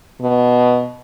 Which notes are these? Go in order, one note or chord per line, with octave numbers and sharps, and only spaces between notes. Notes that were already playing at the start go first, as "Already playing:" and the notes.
B2